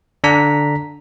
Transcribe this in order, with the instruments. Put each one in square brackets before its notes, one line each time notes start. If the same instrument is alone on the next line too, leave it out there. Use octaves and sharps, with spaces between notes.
[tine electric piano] D3 D4 A#5 B6